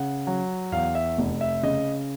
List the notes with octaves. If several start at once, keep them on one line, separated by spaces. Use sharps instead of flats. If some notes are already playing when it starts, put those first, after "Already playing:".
Already playing: C#3 F#5
F#3
E2 F5
E5
F1
E5
C#3 D#5